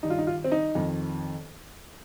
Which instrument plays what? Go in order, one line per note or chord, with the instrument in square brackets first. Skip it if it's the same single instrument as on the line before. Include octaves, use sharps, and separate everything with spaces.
[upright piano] G2 D#3 D#4
F4
D#4
F4
C4
D#4
F2 D#3